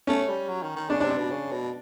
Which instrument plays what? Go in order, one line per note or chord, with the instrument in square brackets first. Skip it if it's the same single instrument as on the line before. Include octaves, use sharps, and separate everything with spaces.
[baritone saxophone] A3 [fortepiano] C#4
[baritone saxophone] G3
F#3
D#3
D#3
[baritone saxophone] C#3 [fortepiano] D4
[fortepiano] D4
[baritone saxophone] C3
[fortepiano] D4
[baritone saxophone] B2
C#3
B2